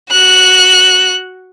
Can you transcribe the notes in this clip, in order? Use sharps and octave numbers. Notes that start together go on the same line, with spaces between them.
F#4 F#6